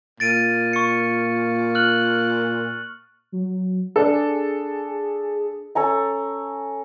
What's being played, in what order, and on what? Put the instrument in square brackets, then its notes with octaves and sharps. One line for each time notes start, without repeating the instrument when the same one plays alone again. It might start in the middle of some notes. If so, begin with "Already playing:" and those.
[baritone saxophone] A#2 [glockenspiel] A6 D7 D#7
[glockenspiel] C#6 C#7
F6 F#6 F#7
[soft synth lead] F#3
[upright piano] D4 A4 [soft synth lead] G#4
[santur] C#4 A4 G#5 A#5